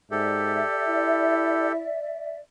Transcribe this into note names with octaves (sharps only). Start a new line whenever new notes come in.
G#2 G4 A4 D5 E5
E4